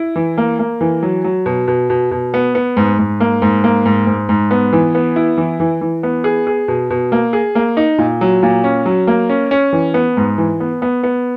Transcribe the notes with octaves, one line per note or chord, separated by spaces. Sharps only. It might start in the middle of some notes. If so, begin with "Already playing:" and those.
Already playing: E4
E3
A#3
A#3
E3
F#3
F#3
B2
B2
B2
B2
B3
B3
G#2
G#2
A#3
G#2
A#3
G#2
G#2
G#2
B3
E3
B3
E4
E3
E3
E3
B3
G#4
G#4
B2
B2
A#3
G#4
A#3
D#4
A#2
F#3
A#2
C#4
F#3
A#3
C#4
C#4
E3
B3
G#2
E3
B3
B3
B3